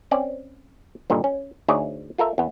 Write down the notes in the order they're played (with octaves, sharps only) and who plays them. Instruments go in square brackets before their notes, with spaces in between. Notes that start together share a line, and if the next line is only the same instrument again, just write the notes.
[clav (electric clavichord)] C4 C#4 D5
G2 A#2 D3 D#3
C#4
D2 D#4 G#4 C#5 D5
F4 A4 A#4 E5
E2 B3